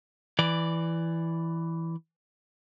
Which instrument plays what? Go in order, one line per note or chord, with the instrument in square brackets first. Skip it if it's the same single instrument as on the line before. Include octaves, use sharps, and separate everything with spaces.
[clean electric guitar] E3 D5